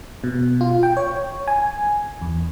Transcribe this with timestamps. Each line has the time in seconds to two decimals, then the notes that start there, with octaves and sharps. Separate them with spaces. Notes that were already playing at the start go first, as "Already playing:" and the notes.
0.24 B2
0.61 F4
0.83 G5
0.97 C#5
1.48 G#5
2.21 E2